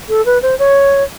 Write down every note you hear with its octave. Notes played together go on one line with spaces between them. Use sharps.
A4
B4
C5
C#5